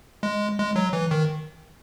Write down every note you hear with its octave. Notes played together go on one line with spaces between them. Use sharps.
G#3
G#3
F#3
E3
D#3